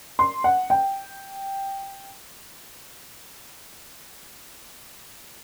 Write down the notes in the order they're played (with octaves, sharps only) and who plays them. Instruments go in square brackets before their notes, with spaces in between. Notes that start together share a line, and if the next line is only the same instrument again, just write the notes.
[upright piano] C6
F#5
G5